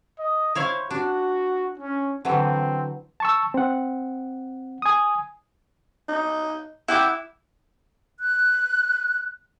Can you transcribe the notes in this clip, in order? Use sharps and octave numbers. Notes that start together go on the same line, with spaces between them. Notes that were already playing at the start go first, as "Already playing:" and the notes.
D#5
E4 C5 C#5 F5
D4 F#4
C#4
D3 E3 F#3 C4
A5 C#6 E6
C4 F#5
G#5 D#6
D#4
E4 F#5 G5 D6
F#6